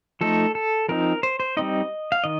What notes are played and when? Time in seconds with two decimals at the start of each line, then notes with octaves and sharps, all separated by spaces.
0.21 F3 A3 D#4 A4
0.55 A4
0.89 F3 C4 D#4 A#4
1.23 C5
1.40 C5
1.57 G3 C4 D#4 D#5
2.12 F5
2.24 D#3 D#5